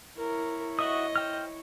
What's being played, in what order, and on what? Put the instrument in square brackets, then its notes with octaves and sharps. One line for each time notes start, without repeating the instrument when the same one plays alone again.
[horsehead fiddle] E4 C#5 [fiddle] A#4
[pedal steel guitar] F#4 E5 D#6 [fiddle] D#5
[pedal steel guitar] C5 G5 F6